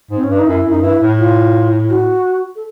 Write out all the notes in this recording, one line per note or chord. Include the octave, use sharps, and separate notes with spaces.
G#2
C4
C#4
G2 D4
D#4
F#2 E4
F#2
D#4
G2 E4
A2
F4
F#4
A4